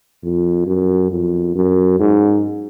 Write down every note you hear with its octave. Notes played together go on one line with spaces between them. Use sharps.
F2
F#2
F2
F#2
G#2